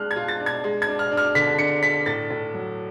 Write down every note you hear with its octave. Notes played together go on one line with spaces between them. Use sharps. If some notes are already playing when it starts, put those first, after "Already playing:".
Already playing: G#3 D4 F6 F#6
G#6
F4
A6
D4
G#6
G#3
G#6
D4
F6
D4
F6
D3 B6
D4 C#7
D4 B6
A2 A6
A2
F#3